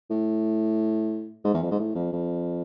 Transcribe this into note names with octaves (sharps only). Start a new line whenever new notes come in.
A2
G#2
E2
F2
G#2
A2
F2
F2